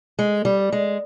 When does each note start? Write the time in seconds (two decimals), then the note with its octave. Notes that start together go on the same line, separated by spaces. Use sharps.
0.19 G#3
0.45 G3
0.72 G#3